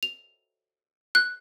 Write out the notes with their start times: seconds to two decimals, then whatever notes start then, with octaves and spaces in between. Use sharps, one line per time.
0.03 F7
1.15 F#6